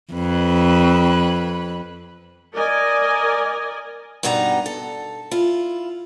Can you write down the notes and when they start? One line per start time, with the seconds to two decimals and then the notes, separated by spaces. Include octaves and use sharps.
0.14 F2 B4
2.53 A#4 D5 D#5 G#5
4.23 G2 B2 B3 D#4 E4 A#5
4.66 A4
5.31 E4 F4